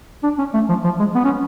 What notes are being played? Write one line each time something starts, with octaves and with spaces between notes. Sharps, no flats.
D4
C#4
A3
F3
F3
G#3
B3
C#4